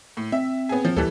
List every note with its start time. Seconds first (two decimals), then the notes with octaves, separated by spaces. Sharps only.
0.17 A2
0.32 C4 E5
0.69 B3 G#4
0.85 F3
0.97 D2 E3 G3 A4